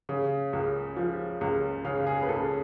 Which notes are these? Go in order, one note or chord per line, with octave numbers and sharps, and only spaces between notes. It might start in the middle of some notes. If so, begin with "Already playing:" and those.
C#3
C#2
F3
C#2
C#3 F5
G#4
B4
C#2 A4